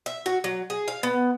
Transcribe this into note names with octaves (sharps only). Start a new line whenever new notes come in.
E5
F#4
F#3
G#4
F5
B3